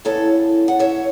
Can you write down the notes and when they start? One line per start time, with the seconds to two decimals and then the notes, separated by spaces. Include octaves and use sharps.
0.05 E2 C#3 E3 A4 C#5
0.68 F#5
0.79 C#5 E5